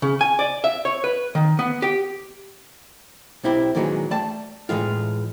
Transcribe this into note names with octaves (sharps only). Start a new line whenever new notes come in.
C#3
G#5
D5
E5
C#5
B4
D#3
B3
G4
B1 C4 E4 G4
A#2 D#3 E3 F#3 G#3
A3 D5 G5 A5
A2 E3 G#3 F4